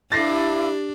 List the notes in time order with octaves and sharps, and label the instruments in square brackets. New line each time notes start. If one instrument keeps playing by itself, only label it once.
[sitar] G2 [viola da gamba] D4 [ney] E4 [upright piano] A6 A#6 C7